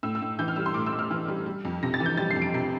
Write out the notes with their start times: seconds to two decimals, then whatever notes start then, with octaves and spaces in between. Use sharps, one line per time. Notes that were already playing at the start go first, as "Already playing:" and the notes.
0.03 A2 E6
0.15 E6
0.21 A2
0.39 E3 G6
0.48 F6
0.56 G3 E6
0.66 C6
0.74 A2 D6
0.86 E6
0.92 A2
0.99 F6
1.11 E3
1.28 G3
1.46 G3
1.65 F2
1.83 C3 A#6
1.94 A6
2.00 E3
2.06 G6
2.17 G3 A6
2.31 C7
2.36 F2
2.42 D7
2.54 C3 C7